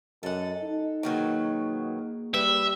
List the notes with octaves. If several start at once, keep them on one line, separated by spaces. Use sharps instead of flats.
F#2 A4 D#5 F#5
D#4
B2 D#3 F#3 A#3 G#4
G3 B4 E5